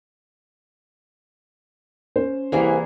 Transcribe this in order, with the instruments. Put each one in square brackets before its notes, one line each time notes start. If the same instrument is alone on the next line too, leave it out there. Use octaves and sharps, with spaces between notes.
[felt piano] C#4 C5
[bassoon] C2 [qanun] E3 A#3 G#4 [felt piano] D5